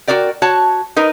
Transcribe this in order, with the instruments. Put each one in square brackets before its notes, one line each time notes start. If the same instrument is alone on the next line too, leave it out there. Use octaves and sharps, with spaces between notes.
[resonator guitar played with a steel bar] F#4 A4 A#4 D5 G5
F#4 C#5 A5
D#4 A#4 B4